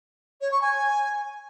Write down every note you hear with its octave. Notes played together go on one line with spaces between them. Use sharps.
C#5
C#6
G#5